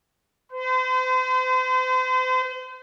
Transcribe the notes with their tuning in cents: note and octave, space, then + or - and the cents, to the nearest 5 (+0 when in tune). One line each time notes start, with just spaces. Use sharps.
C5 -40